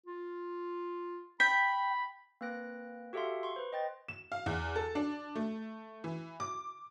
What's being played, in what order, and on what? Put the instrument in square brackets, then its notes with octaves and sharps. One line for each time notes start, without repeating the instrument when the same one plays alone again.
[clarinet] F4
[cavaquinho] G5 [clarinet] B5 [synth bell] B6
[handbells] A#3 C4 B4 F#6 A#6 D7
F#4 G4 A4 E5 F5 C6
C6 C#6
B4 C5
D#5 G5 A6
[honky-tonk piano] E7
F5
E2
A4
D4
A3
E3
D6